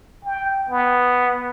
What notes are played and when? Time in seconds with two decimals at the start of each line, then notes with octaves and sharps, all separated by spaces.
0.25 G5
0.70 B3